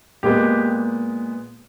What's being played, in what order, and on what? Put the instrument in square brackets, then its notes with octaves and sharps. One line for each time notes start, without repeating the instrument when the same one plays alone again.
[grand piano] A#2 G#3 B3 G4